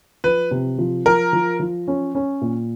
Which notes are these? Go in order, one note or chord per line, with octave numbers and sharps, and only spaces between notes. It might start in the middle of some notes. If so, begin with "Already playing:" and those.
F3 B4
C3
F3
F3 A#4
F3
F3
C#4
C#4
A#2